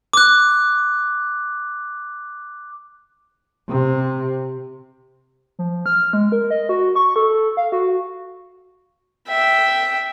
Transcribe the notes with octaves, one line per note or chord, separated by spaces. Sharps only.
D6 F#6
C3
F3
F6
G#3
A#4
D#5
F#4
C#6
A4
F5
F#4
E5 G5